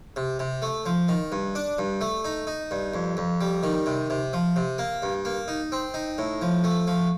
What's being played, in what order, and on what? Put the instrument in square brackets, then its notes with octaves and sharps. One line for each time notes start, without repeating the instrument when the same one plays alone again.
[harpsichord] C3
C3
A3
F3
D#3
G2
D4
G2
A3
D#4
D#4
G2
F2
F2
G3
D#3
C3
C3
F3
C3
A#3
G2
A#3
D#4
C4
D#4
A2
F3
A3
F3